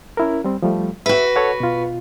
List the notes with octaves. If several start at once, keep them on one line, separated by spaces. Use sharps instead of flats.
C#4 E4 A#4
G3 C4
F3 G3 A3
F#4 B4 E5
A4 C#5 F#5
B2 F4